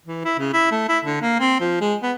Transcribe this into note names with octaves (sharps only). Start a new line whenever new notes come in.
E3
E4
C#3
E4
A3
E4
D3
A#3
C4
F3
G#3
B3